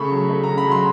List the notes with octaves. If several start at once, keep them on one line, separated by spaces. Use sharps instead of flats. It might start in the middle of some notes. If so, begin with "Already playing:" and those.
Already playing: C#3 A3 B5 C#6
F#3
A3
A#5
C#3
B5
F#3
C6